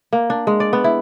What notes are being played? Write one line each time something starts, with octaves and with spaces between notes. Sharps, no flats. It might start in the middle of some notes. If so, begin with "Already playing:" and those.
A#3
D4
G#3
D5
B3
E4